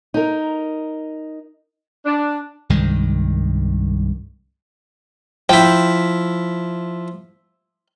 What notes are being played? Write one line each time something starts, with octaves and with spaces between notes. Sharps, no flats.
D#4 A#4
D4
C2 G2 D#3 G#3
F3 E4 G5